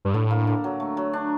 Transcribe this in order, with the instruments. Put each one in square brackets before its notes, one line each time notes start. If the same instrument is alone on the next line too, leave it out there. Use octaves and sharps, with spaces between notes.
[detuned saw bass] G2
[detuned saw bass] A2 [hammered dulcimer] D3
[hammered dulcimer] A#3
D3
F#3
A3
F#3
D4